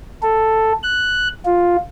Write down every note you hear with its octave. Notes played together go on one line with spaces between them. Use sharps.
A4
F#6
F4